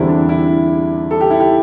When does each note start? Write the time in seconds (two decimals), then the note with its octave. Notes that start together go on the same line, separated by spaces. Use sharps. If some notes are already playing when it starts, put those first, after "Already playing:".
Already playing: E2 D3 G3 C4 E4
0.08 D4
0.29 E4
1.11 A4
1.21 G4
1.30 E4
1.40 G4